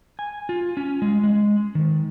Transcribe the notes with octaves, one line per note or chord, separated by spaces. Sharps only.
G#5
F4
C#4
G#3
G#3
D#3